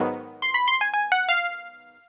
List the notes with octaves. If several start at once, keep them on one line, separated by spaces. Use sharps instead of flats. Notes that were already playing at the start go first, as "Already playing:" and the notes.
Already playing: G#2 D#3 F#3 B3 D#4
C6
B5
C6
G#5
G#5
F#5
F5